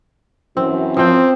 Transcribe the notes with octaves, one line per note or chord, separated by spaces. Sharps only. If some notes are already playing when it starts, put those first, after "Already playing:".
F#2 E3 C4
F3 C4 G5